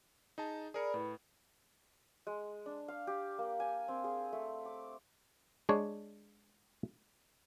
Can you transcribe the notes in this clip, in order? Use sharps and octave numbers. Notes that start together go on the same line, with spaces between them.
D#4 G#4 A5
G#4 A#4 D5 B5 C#7
A2 E4 B4 B5
G#3
D4
F5
G4
A#3
G#5
C4
G#4
A3
D6
G#3 D4 C#5